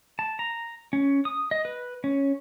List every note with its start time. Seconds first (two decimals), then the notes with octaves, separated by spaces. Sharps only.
0.19 A5
0.39 A#5
0.93 C#4
1.25 D#6
1.51 D#5
1.65 B4
2.04 C#4